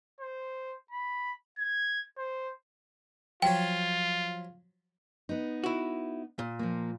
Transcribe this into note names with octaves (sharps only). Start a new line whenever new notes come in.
C5
B5
G#6
C5
F3 F#3 F4 C#5 G5
B3 D#4
E4 F#4
A#2
F3 A#3